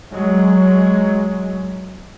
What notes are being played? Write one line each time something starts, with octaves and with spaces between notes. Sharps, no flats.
F#3 G#3